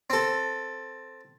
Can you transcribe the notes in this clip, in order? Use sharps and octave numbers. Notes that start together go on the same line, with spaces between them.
C4 A4